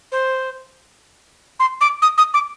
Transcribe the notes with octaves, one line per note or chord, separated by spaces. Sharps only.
C5
C6
D6
D#6
D#6
D6